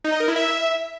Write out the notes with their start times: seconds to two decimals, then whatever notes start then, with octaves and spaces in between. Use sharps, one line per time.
0.04 D#4
0.12 D#5
0.20 A#4
0.28 E4
0.36 E5